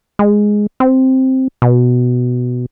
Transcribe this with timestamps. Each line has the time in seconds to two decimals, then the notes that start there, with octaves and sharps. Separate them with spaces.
0.19 G#3
0.80 C4
1.62 B2